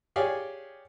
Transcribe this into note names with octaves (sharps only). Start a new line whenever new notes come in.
G4 G#4 C#5 D5 F5 G#5